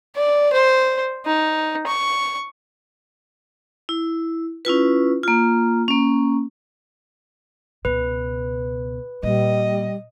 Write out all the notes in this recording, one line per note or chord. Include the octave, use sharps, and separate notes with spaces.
D5
C5
D#4
C#6
E4
C#4 E4 F4 B4
A#3 F4
A#3 C#4
C#2 B2 B4
A#2 G3 D#5